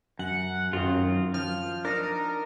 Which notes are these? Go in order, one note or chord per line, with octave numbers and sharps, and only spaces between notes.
F#2 F#5
F#2 D#3 C4 F4
F3 F6
D4 D#4 A#4